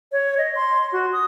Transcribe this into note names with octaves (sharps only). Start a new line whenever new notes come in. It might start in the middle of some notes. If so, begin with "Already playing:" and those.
C#5
D#5
C6
F#4
D#6